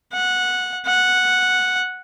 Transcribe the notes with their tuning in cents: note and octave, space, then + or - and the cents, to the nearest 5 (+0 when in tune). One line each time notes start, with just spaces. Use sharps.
F#5 -10
F#5 -5